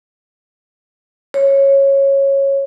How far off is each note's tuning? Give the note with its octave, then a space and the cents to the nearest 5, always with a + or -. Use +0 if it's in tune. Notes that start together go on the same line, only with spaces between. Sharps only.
C#5 -10